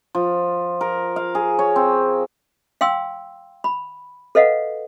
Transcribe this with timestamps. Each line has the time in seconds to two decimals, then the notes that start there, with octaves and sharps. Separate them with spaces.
0.15 F3
0.81 A#4
1.16 F5
1.35 G#4
1.59 C#5
1.76 C4
2.81 F5 G5 C6 E6
3.64 B5
4.35 A4 B4 D#5 F5 F#5